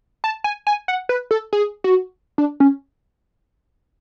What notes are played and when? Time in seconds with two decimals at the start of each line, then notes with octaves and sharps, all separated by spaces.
0.24 A5
0.44 G#5
0.67 G#5
0.88 F#5
1.09 B4
1.31 A4
1.53 G#4
1.84 F#4
2.38 D4
2.60 C#4